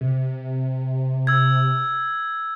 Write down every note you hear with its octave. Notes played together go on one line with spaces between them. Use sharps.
C3
E6 G#6